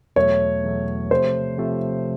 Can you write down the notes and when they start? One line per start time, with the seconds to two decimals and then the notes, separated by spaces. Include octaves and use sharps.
0.16 E2 B2 F#3 A3 C#5
0.64 E2 B2 F#3 A3
1.11 C3 F3 A3 C5
1.58 C3 F3 A3